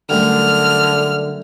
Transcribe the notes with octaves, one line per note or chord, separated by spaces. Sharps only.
F#2 D3 G3 A3 F6